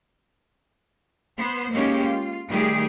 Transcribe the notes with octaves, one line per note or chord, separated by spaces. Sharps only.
B3 C5
G#3 A#3 C#4 D#4 G4
F4
D#3 G3 A3 G4 G#4